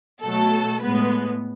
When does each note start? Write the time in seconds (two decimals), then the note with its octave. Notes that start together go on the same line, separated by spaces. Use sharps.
0.24 B2 F#3 A3 A4
0.81 A2 G#3 B3 B4